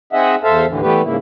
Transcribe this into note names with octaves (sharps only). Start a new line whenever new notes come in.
C4 D#4 G#4 D#5 E5 F#5
E2 A4 C5 E5 F5 A5
D#2 A2 D3 E3
E3 G3 A3 B3 G4 B4
G#2 C#3 A#3 E4